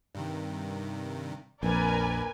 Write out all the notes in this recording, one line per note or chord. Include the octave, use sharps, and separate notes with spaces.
G2 C3 D#3
A#1 F2 A#4 B4 D5 G#5